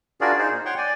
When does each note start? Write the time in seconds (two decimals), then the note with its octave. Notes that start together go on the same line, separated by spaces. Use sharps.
0.21 D4 F4 F#4 G#4 A#4 D5
0.39 D#4 G#4 C5
0.51 A#2
0.65 C#5 F#5 G5 C6 C#6
0.78 D5 G#5